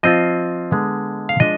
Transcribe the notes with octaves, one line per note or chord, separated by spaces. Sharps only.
F3 C4 F4 D#5
D3 G#3 B3
F5
F3 G#3 D4 D#5